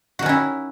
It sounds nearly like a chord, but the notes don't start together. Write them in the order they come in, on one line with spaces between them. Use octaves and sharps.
F#4 D#3 C#4 E4